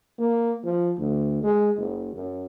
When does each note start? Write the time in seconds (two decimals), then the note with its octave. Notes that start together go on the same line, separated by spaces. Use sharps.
0.19 A#3
0.64 F3
0.98 D2
1.43 G#3
1.77 F#1
2.15 F#2